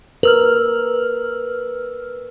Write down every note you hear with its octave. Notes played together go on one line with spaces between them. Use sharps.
A#4 B4 E6 F6